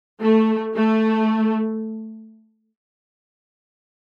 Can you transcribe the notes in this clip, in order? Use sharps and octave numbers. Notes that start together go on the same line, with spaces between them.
A3
A3